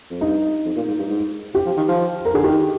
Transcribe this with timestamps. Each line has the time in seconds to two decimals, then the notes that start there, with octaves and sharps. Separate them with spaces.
0.11 F2
0.21 G2 D#4
0.66 F2
0.76 A#2
0.88 G#2
0.99 G2
1.10 G#2
1.54 C3 G4
1.66 F3
1.77 D#3
1.88 F3
2.25 A#4
2.34 D3 G#4
2.43 D#3 G4